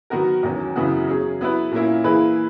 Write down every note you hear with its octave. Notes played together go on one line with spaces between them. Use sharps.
D#3 F#3 B3 F#4 A#4
E2 D#3 F#3 C#4
F#2 C#3 E3 B3 F#4
F#3 C#4 G#4
F#3 B3 E4 B4
A#2 A#3 C#4 E4
E3 A#3 E4 G#4 B4